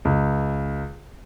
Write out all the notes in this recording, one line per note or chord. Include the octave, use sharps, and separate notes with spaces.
C#2